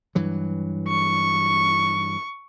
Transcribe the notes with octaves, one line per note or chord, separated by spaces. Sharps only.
G2 E3 F#3
C#6